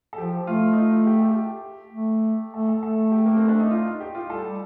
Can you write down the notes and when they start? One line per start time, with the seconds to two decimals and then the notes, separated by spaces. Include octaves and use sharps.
0.13 A4
0.18 F3 G4
0.47 A3 F4
0.73 D#4
0.78 F4
1.07 G4
1.19 A4
1.31 G4
1.94 A3
2.53 A3 A4
2.68 A4
2.83 A3 A4
3.12 G4
3.26 A#3
3.36 C4
3.48 D4
3.59 D#4
3.71 F4
3.85 D#4
4.00 G4
4.15 F4
4.30 G3 A4